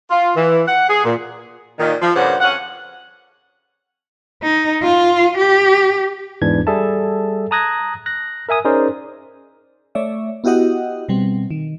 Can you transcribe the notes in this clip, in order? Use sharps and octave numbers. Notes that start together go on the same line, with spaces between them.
F4
E3
F#5
G#4
A#2
A#2 D#3
F3
G2 A#2 C#3 C5 F#5
F2 C#4 F#5
D#4
F4
G4
E2 G#2 E3 D4 G#6
G3 G#4 A4 E5 A5
A5 A#5 D#6 F#6 G#6 A#6
F#6 A#6
A#4 E5 G#5 D#6
C#4 D#4 G#4 A#4 C5 D5
A3 C#5 D5 E5
B3 E4 F#4 G4 D#5 F#5
B2 G3 C4
D#3